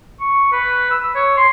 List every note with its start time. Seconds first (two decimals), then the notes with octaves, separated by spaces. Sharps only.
0.20 C#6
0.52 B4
0.91 E6
1.15 C#5
1.37 C6